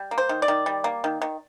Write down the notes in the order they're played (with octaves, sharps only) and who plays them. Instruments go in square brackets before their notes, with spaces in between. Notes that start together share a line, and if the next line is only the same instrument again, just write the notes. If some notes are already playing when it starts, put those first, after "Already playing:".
Already playing: [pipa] G3
A#3
C5
D#3
D5
D#3
G3
A#3
D#3
D#3